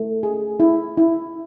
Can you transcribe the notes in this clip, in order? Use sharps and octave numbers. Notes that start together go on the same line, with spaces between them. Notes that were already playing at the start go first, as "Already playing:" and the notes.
Already playing: A3
G#4
E4
E4